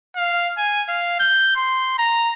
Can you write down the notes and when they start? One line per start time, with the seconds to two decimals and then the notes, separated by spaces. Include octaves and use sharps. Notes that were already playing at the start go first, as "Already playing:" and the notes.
0.16 F5
0.58 G#5
0.88 F5
1.20 G6
1.56 C6
1.98 A#5